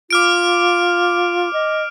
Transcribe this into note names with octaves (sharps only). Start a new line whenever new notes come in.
F4 D6 F6 D7
D#5